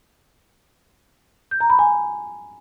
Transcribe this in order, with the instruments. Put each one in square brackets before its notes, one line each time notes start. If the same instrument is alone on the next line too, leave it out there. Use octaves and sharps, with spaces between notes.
[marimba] G6
A#5
B5
G#5